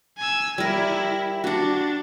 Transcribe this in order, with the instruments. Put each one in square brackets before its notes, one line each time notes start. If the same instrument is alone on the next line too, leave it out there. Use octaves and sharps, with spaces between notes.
[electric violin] G#5 E6
[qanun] G3 A#4 [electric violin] E4
[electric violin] D4 [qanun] F#4 F#5